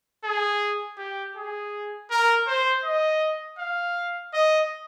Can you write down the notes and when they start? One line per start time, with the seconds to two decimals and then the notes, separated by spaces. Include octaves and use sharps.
0.24 G#4
0.98 G4
1.36 G#4
2.11 A#4
2.47 C5
2.84 D#5
3.59 F5
4.34 D#5